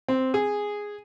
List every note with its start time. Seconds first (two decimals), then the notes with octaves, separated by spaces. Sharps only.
0.08 C4
0.34 G#4